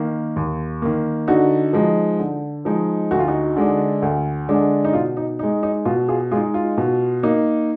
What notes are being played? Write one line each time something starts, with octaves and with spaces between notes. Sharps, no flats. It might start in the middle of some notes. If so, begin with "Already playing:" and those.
Already playing: D#3 A#3
D#2
D#3 A#3
D3 D#4 F#4
F3 G#3 D#4
D3
F3 G#3 D#4
D2 F#4
F4
D#4 F#4
D3 G#3 D4
D2
D3 G#3 D4
D#4
B2 F4
D#4
G#3 D#4
D#4
B2 F4
F4 G#4
G#3 F4 G#4
D#4
F4
B2
A#3 D#4